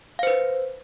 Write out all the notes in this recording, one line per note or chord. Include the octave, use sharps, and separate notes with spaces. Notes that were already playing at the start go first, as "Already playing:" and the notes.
B4 C5 F5